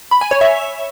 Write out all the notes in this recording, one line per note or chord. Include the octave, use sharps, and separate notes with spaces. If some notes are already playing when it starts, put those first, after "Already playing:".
B5
G#5
C#5
E5